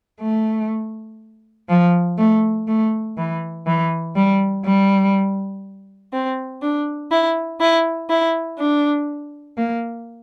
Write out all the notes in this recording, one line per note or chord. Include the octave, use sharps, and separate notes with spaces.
A3
F3
A3
A3
E3
E3
G3
G3
C4
D4
E4
E4
E4
D4
A#3